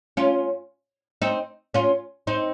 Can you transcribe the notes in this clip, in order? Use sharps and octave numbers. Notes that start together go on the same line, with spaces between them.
C#4 F4
C4 D#4
C#4 F4
C4 D#4